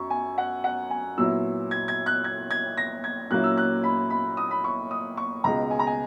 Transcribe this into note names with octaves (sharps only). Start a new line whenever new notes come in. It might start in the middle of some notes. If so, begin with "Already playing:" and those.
Already playing: F#2 C#6
G#5
F#5
F#5
G#5
A#2 F#3 B3 E4 E6
G#6
G#6
F#6
G#6
G#6
A#6
G#6
A#2 F#3 A#3 C#4 E4 F#6
E6
F#6
B5
B5
D#6
B5
C#6
D#6
C#6
C#2 B2 G#3 A#5
G#5
A#5
G#5